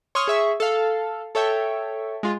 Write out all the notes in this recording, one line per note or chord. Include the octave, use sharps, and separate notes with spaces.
C#5 C6 C#6 D#6 F6
G#4 E5 C#6
A4 F5
A4 C#5 E5 G5
G#3 F4